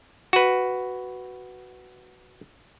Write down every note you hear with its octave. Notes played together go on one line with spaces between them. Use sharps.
F#4 B4